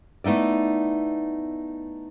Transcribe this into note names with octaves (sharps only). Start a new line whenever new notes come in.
A3 B3 D#4 E4 D5